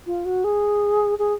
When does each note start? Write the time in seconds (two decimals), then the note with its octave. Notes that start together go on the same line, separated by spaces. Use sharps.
0.07 F4
0.25 F#4
0.44 G#4
1.19 G#4